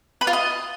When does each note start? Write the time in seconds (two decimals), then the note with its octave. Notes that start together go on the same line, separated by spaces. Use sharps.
0.21 B4
0.27 F4
0.33 D#5